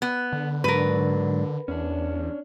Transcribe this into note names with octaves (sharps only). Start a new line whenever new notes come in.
B3
D3
G#2 F#3 D4 A#4 B4
E2 C#4 D4